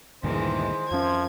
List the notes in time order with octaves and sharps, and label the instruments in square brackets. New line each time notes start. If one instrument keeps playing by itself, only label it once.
[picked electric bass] D2 G2 A#2 [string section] D#3 E3 G#3 [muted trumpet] C5
[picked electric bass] F2 C#4 [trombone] F3 [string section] G#6